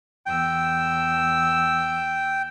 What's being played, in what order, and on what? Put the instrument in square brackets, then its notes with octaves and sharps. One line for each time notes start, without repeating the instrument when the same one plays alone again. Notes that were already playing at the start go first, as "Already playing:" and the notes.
[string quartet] E2 E6 [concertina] G5